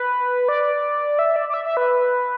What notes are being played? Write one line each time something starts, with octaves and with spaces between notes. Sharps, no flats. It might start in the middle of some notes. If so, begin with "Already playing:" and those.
Already playing: B4
D5
E5
D5
D5
E5
E5
B4